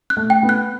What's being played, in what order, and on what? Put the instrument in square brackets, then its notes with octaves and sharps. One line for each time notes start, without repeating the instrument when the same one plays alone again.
[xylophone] F#6
[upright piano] A3
[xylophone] G5
[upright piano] B3
[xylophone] F#6